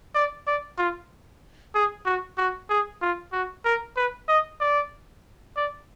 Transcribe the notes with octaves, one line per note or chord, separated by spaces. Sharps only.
D5
D5
F4
G#4
F#4
F#4
G#4
F4
F#4
A#4
B4
D#5
D5
D5